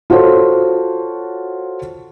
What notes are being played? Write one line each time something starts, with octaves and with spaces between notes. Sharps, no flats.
F4 F#4 A4 C5 C#5